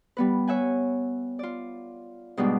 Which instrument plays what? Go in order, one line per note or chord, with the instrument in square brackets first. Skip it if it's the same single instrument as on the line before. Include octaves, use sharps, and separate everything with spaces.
[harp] G3 B3 B4
C#5 E5 F#5 G#5
F4 D5
G#2 B2 G3 D4